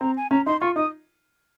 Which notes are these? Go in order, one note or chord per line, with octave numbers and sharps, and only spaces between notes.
C4 A#5
G#5
C#4 A#5
D#4 C6
F4 C#6
D#4 D#6